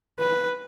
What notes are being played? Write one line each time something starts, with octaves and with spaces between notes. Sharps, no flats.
B4